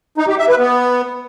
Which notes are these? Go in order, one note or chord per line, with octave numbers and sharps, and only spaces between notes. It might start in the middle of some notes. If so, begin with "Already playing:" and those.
D#4
G4
E5
B4
B3